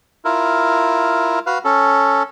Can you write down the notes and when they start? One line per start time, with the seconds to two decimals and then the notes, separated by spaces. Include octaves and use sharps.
0.25 E4 F4 A#4
1.46 F#4 B4 F5
1.65 C#4 A4